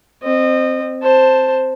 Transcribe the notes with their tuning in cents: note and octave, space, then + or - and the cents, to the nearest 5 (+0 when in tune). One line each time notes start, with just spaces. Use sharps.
C4 +0 D#5 -25
C5 +0 A5 +0